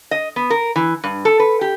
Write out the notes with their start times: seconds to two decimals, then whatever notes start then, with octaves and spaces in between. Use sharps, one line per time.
0.11 D#5
0.36 B3
0.50 A#4
0.76 E3
1.04 G2
1.25 A4
1.40 B4
1.61 G4